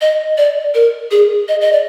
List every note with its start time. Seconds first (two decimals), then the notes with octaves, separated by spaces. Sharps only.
0.01 D#5
0.38 D5
0.75 A#4
1.11 G#4
1.48 D#5
1.61 D#5
1.73 D5